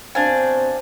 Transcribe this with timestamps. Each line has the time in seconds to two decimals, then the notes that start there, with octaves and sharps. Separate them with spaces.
0.15 B2 C4 D4 C5 F5 G#5